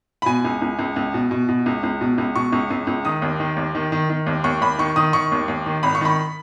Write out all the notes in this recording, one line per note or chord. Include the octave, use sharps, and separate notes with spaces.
B5
B2 G#5
C#2
C#2
C#2
C#2
B2
B2
B2
C#2
C#2
B2
C#2
B2 C#6
C#2
C#2
C#2
D#3 D#6
D#2
D#3
D#2
D#3
D#3
D#3
D#2
D#2 C#6
D#2 B5
D#3 C#6
D#3 D#6
D#3 C#6
D#2
D#2
D#3
G#1 B5
C#6
D#3 B5